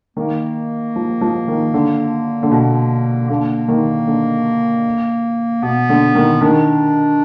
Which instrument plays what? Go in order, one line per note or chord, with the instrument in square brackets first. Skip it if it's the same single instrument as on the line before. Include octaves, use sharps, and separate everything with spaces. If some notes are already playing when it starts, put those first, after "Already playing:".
[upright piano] D#3 [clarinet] A#3
[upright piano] F3
F3
D#3
D3
D3
B2
[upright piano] D3 [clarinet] A#3
[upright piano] D#3
D3
[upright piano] B2 [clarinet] B3
[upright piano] D3
D#3
[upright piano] D#3 [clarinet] D4